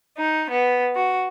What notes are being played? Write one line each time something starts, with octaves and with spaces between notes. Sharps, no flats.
D#4
B3
F#4